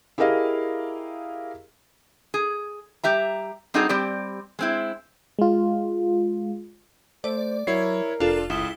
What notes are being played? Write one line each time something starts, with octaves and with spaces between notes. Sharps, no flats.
E4 G4 G#4 A#4 D#5 F5
G#4
G3 G4 E5 A#5
G3 C4 D#4 F#4 G#4 A4
G3 C4 G4 D5
G#3 C4 E4
G#3 F4
A3 C5 D5
F#3 E4 A#4 C#5 C7
F1 D4 F4 A4
C#2 E4 D#6 G7